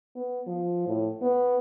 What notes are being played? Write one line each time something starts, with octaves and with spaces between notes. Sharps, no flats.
B3
F3
A2
B3